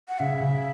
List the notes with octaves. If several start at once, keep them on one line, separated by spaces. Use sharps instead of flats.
F#5
C#3 E5
C#3